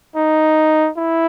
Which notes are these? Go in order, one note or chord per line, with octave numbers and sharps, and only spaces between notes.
D#4
E4